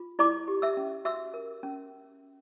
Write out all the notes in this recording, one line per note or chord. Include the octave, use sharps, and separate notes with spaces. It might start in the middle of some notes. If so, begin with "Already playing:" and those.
Already playing: F4
E4 D5 D6
G4
E5 E6
C#4
F#4 E5 E6
A#4
C#4